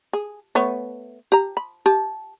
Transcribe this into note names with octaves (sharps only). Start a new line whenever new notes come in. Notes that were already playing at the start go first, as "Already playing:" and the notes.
G#4
A3 B3 C#5
G4 A#5
B5
G4 A5